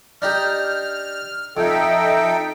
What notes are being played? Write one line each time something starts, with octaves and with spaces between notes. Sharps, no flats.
D4 D#4 G4 F6
F2 D#4 A4 D#5 E5 G5